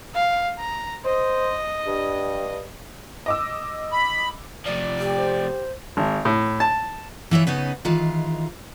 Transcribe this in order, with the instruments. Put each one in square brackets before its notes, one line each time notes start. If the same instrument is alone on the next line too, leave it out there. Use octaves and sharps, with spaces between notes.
[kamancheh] F5
A#5
[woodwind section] C5 [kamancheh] D#5
[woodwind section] G2
[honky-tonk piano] D#5 D6 E6
[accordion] B5
[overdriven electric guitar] C3 F3 [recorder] D5
[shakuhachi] G4
[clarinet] C5
[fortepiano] G#1
A2
A5
[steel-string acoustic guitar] E3 E4 F4 C#5
C#3 B3 C#4 D#4
D#3 E3 G#3 F4